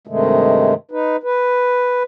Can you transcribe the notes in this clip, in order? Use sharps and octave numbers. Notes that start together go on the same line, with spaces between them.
G2 C3 D#3 G#3 A3
D#4 B4
B4